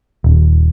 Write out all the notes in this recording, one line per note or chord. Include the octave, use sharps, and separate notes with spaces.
D#1